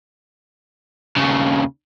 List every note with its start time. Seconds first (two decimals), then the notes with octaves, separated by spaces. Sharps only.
1.17 D#2 C#3